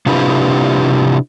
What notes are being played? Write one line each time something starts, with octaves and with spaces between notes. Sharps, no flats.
C3 D4 E4 F4 G4 B4